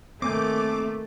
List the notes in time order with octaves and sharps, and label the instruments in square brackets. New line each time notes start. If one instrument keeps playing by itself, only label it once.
[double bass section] D#3 A#3 [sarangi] A3 [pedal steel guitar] C4 G#5 G6 [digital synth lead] D6